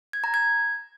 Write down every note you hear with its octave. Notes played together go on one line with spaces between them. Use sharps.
G#6
A#5
G#6